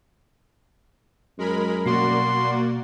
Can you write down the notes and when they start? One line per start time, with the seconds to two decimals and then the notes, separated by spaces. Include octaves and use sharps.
1.39 F#2 G#3 A#4 B5
1.86 B2 G3 A#3 F#4 D5 C6